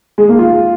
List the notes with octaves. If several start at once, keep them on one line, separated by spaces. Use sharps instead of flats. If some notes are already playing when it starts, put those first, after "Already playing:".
G#3
A#3
F4